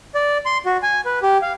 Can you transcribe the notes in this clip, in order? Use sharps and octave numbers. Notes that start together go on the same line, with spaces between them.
D5
C6
F#4
G#5
B4
G4
F5